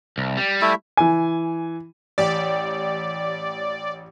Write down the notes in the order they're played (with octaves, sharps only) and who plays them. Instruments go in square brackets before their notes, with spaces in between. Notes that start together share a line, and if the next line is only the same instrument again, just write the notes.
[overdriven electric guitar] C2
G3
[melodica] A3 E4 E5
[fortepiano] E3 G#5
[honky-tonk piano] A1 G4 [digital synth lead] D5